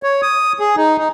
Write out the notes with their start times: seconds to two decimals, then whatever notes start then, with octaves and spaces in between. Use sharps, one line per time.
0.03 C#5
0.22 D#6
0.60 G#4
0.77 D#4
0.98 D#4